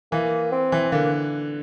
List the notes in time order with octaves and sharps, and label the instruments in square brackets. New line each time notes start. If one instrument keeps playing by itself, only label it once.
[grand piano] E3 [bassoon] A#3
[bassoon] C4
[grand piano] E3
[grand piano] D3 [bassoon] A#3